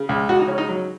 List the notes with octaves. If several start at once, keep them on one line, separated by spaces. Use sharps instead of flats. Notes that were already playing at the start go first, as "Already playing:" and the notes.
Already playing: C#3
C#2
C#2 F#4
D#4
C#3 C#4
D#4
F#3